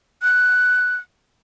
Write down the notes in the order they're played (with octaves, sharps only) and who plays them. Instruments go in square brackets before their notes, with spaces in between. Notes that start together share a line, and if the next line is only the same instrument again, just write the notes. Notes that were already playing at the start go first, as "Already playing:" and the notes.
[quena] F#6